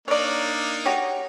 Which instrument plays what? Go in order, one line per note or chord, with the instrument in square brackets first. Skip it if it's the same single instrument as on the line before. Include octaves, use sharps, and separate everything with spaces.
[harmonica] A#3 D4 D#4 [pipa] C#5 D5
[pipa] F#4 G4 C#5